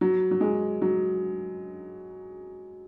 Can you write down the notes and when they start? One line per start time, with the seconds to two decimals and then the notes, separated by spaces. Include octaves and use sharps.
0.01 F#3
0.31 F#3
0.41 G#3
0.82 F#3